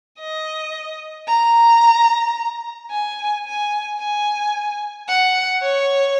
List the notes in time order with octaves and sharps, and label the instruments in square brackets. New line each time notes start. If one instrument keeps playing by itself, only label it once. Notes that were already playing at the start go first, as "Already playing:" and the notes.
[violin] D#5
A#5
G#5
G#5
G#5
F#5
C#5